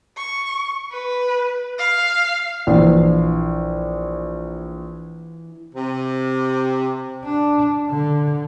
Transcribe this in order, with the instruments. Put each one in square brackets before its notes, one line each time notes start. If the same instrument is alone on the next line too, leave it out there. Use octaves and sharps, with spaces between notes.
[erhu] C#6
B4
F5
[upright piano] A#1 [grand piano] E3
[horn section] C3
[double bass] D4
D3